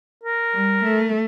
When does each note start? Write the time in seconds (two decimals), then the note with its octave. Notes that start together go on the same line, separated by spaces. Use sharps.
0.23 A#4
0.53 G3
0.84 A3